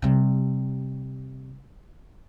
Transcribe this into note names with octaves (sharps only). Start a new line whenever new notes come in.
C3 G3